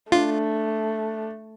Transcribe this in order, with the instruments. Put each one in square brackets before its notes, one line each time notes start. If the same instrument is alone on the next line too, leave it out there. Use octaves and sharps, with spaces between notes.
[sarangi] A3 [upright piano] D4 [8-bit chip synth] F4